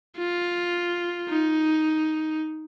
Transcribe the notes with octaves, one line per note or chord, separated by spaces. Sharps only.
F4
D#4